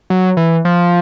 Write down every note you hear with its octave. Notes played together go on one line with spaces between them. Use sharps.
F#3
E3
F3